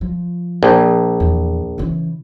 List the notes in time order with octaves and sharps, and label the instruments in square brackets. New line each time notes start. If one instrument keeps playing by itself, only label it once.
[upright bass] F3
[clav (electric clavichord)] A#1
[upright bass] E2
C#3 E3